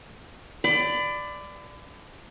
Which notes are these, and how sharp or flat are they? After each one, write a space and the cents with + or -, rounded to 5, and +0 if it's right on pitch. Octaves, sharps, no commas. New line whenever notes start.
D5 +5 B5 +35